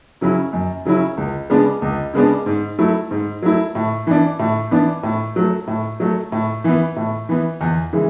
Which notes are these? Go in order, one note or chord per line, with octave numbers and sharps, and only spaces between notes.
C#3 F#3 C#4 E4
F#2
C#3 F#3 C#4 E4
C#2
C#3 G#3 B3 D4
C#2
C#3 G#3 B3 D4
G#2
F#3 A3 E4
G#2
F#3 A3 E4
A2
E3 B3 D4
A2
E3 B3 D4
A2
F#3 A3
A2
F#3 A3
A2
E3 B3
A2
E3 B3
E2
C#3 E3 G#3